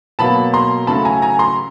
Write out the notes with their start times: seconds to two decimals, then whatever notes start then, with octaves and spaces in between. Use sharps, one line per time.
0.19 B2 F#3 A#3 A5 B5
0.54 A#5 C6
0.87 C#3 F#3 A3 A5 B5
1.05 G#5 A#5
1.22 G#5 A#5
1.39 A#5 C6